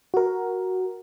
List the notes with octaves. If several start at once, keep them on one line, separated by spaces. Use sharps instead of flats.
F#4 A#4